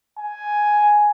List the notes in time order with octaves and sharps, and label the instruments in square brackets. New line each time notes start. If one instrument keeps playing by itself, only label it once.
[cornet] G#5